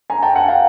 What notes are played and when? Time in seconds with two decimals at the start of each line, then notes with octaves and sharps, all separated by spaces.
0.10 G#5 A#5
0.22 G5 A5
0.35 F#5 G#5
0.48 F5 G5